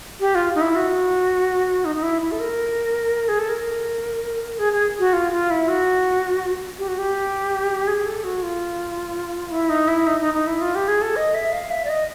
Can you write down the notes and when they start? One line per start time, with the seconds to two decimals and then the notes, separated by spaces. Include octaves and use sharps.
0.20 G4
0.35 F4
0.55 D#4
0.61 E4
0.76 F#4
1.85 D#4
1.96 D#4
2.03 E4
2.21 E4
2.32 A4
2.40 A#4
3.28 G#4
3.39 A4
3.49 A#4
4.59 G#4
4.73 G#4
4.99 F#4
5.13 F4
5.32 F4
5.51 E4
5.68 F#4
6.78 G4
6.88 F#4
6.98 G4
7.88 G#4
8.06 A4
8.24 F#4
8.43 F4
9.51 E4
9.69 D#4
9.88 E4
10.07 D#4
10.21 D#4
10.34 D#4
10.47 E4
10.61 F4
10.75 G4
10.88 G#4
11.02 A4
11.16 D#5
11.34 E5
11.52 F5
11.70 E5
11.85 D5
11.89 D#5